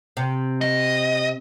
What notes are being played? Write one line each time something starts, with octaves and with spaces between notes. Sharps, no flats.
C3
D#5